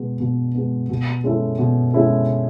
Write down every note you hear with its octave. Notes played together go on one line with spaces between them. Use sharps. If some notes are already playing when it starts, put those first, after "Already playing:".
Already playing: B2 G#3 B3
B2
G#3 B3
B2
G#3 C#4 E4 A4
B2
G#3 C#4 E4 A4